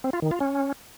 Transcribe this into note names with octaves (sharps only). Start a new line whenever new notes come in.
C4
F4
D#3
F4
C#4